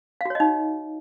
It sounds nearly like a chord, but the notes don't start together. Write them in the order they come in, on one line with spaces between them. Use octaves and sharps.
F5 F#4 C#5 D#5 D#4